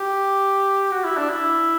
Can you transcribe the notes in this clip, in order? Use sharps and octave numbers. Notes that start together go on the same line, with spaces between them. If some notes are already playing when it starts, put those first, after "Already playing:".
Already playing: G4
F#4
E4
D4
E4